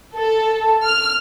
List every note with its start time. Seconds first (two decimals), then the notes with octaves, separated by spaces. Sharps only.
0.16 A4
0.85 F6